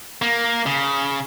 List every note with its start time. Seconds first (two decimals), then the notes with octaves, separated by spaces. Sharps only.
0.22 A#3
0.66 C#3